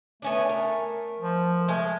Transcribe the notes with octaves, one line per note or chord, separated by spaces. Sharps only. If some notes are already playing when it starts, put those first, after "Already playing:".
A3 B3 C#4 D4
A#4
F3
G#3 A3